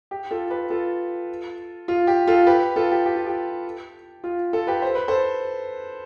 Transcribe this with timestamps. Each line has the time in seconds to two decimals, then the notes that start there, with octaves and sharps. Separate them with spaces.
0.11 G4
0.31 F4 A4
0.50 G4 B4
0.70 F4 A4
1.88 F4
2.07 G4
2.27 F4 A4
2.47 G4 B4
2.76 F4 A4
2.91 G4
3.06 G4
3.16 F4
3.27 G4
4.24 F4
4.53 F4 A4
4.67 G4 B4
4.82 C5
4.95 B4
5.08 A4 C5